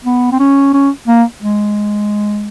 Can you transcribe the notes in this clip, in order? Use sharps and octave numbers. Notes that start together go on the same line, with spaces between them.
B3
C4
C#4
C#4
A#3
G#3